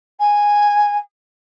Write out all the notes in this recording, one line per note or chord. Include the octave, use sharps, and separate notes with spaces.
G#5